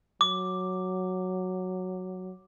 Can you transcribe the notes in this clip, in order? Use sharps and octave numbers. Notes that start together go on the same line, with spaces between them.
F#3 D6